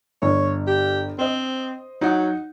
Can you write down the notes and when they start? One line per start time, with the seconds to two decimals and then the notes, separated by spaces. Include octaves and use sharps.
0.22 G1 C#5
0.67 G4
1.19 C4 C5 D#5
2.01 F#3 D#4 F#5